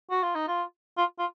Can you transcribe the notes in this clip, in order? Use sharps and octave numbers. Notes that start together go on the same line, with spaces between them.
F#4
F4
D#4
F4
F4
F4